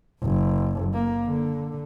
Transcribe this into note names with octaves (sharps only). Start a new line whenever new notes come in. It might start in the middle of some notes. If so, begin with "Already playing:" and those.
F#1
A#3
D3